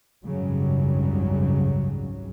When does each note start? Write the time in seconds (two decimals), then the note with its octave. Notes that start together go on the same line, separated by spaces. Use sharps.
0.25 G#1 C#2 F#2 C#3 F#3 G3